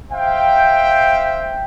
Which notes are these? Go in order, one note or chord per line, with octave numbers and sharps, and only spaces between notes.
C5 E5 F5 G5